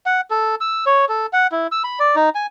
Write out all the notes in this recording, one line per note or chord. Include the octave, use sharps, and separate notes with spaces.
F#5
A4
E6
C#5
A4
F#5
E4
E6
B5
D5
D#4
G#5